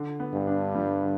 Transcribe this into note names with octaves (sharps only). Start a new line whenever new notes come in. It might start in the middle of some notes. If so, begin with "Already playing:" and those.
Already playing: D3
B3
G2
D4
G3
D3